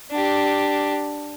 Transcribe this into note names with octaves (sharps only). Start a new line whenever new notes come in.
D4 G4